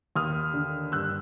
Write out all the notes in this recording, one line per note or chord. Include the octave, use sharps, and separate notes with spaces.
D#2 D#6 F6
D3
G2 E6 F#6